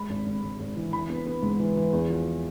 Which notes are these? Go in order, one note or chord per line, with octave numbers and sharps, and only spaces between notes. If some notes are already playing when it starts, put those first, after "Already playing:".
Already playing: G#3 B5
G#1
G#1
G#1
G#1
E3
E3 B5
B3
B3
G#2
E3
E3
E2
F3